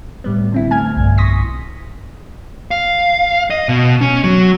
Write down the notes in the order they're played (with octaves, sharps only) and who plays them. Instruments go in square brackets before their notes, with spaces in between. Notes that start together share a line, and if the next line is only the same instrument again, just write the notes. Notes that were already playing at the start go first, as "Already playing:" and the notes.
[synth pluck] A2 G3 B3
D3 C4 E4
A3 G#5 F6 G#6
B1 G2
C6 C#6 D#6 A#6 B6
[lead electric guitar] F5
D#5
B2
C#4
F#3